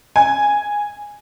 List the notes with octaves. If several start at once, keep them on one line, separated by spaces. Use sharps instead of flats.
G#5